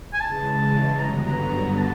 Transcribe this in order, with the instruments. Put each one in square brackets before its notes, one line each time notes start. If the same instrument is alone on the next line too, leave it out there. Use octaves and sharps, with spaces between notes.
[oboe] G#5
[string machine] C#3 E3 G#3 [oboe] A5
[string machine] G2 D3 F#3 B3 [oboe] A#5
[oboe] A#5
A#5
A5